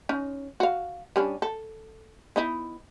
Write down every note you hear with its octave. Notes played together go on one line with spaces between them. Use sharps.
C#4 D#4
F#4 F5
G3 C#4 D4
A4
B3 D#4 E4